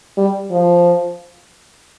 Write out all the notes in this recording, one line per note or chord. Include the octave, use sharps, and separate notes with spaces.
G3
F3